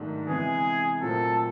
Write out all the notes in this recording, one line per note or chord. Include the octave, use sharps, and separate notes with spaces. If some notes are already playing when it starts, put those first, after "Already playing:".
Already playing: G#2 D#3 F#3 A3 D4
C3 E3 G#3 B3 G#4
A#2 F#3 A3 C4 A4